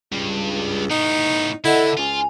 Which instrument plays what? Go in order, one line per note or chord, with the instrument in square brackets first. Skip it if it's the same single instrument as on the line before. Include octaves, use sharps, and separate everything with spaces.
[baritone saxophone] C#2 [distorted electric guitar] G2
[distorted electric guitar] A2 B3 [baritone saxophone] D#4
[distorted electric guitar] D3 [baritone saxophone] E4 [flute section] A4 D#5 F#5
[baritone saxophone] C#2 [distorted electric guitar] F4 [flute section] G#5